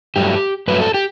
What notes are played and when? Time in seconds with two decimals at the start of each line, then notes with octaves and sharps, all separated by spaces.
0.16 G2 F#3 A3 G4
0.68 G2 F#3 A3 B4
0.81 A4
0.94 G4